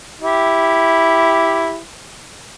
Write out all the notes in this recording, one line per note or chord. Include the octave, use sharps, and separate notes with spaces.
E4 G4